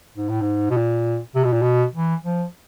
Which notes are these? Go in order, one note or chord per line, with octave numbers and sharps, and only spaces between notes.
G#2
A2
G#2
B2
A#2
C3
B2
A#2
B2
E3
F3